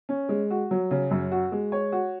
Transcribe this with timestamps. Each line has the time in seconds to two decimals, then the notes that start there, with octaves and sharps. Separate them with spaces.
0.09 C#4
0.29 G#3
0.51 F#4
0.71 F#3
0.91 C#3
1.11 F#2
1.31 F#4
1.52 G#3
1.72 C#5
1.92 F#4